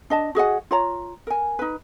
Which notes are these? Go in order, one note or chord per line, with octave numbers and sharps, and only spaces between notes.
D4 D#5 A5
F#4 G#4 D#5 F#5
F4 C#5 A#5
A#4 G#5
D#4 B4